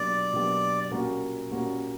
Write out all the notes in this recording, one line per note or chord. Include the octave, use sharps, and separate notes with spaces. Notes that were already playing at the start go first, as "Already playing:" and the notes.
Already playing: B2 F#3 A#3 D4 G4 D5
B2 F#3 A#3 D4 G4
A#2 G3 C#4 F#4 A#4
A#2 G3 C#4 F#4 A#4